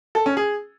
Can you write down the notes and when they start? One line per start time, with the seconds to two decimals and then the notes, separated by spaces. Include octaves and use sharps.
0.15 A4
0.26 C#4
0.37 G#4